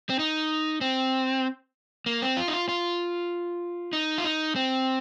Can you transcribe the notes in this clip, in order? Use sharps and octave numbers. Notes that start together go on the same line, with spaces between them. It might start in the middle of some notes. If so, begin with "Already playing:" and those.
C4
D#4
C4
A#3
C4
F4
D#4
F4
F4
D#4
F4
D#4
C4